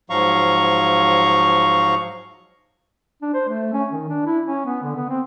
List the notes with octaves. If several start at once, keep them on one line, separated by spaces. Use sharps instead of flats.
G#2 F3 F#3 F5 A#5 C#6
D4
C5
A3
C#4
D#3
D4
E4
C#4
B3
D3
B3
C4